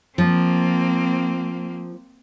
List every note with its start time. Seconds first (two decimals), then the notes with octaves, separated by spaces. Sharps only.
0.18 F3 A#3 C4